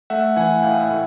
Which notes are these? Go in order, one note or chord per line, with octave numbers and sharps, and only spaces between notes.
A3 E5 F#5
E3 F#5 G#5
A2 F5 G5
E5 F#5
A2